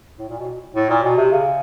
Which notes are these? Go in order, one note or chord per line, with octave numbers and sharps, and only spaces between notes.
A2
A#2
B2
A2
A#2
B2
C3
C#3